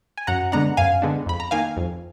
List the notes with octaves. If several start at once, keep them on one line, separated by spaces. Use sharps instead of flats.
G#5
F#2 F#5 A#5
D3 G#3 B3 D4 F#5 A#5
F#2 F5 G#5
D3 G#3 B3 D4
F2 B5
A#5
D#3 A#3 F5 G#5
F2